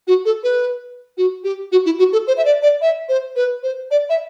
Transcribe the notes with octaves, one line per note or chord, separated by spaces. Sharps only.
F#4
A4
B4
F#4
G4
F#4
E4
F#4
A4
C5
E5
D5
D5
E5
C5
B4
C5
D5
E5